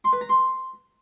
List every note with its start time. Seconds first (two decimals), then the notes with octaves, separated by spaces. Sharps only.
0.04 C6
0.13 B4
0.21 A#5
0.29 C6